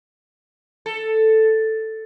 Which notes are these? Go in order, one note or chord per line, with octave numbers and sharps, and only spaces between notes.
A4